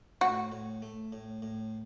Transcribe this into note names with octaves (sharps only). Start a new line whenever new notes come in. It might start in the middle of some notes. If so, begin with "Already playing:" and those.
A2 F#4
A2
A3
A2
A2